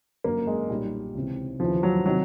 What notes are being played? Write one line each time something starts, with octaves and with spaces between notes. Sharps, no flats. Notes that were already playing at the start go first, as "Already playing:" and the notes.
G1 F#2 D3 A#3
G#3
B1 A#2 G3
C#2 C3 E3
D#2 C#3 E3 F3
F#3
C3 D#3 F#3